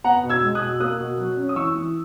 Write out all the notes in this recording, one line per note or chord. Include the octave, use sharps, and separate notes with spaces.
B3 F#5 A#5
B2
E6 G#6
G#3
D#6 F#6
B2
A#3 D#6 F#6
B2
F#3
C#4
D#6
E3 C#6 E6
E3